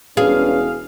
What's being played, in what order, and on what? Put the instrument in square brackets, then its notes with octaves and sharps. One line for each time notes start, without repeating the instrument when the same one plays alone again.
[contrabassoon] E1 [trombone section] C#4 D4 B4 [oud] G#4 [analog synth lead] F5